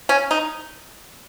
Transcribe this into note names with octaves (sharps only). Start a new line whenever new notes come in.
C#4
D#4